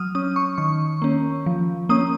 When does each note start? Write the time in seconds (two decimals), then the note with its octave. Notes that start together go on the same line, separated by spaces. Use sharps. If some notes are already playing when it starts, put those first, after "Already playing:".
Already playing: F#3 D#6 F6
0.15 C#4 D#6
0.36 C#6
0.58 D#3 C#6
1.02 A#3 C#4
1.46 F3
1.89 A#3 C#4 D#6